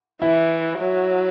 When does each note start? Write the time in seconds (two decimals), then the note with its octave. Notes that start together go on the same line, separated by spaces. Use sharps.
0.22 E3 E4
0.78 F#3